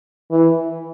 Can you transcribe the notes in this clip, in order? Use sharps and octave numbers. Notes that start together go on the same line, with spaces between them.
E3